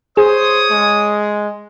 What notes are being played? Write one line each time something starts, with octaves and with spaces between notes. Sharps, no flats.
G#4 C5 C#5 D#6
G#3